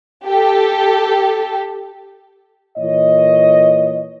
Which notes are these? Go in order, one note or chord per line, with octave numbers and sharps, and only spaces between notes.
G4 A4
A#2 E3 C#5 D#5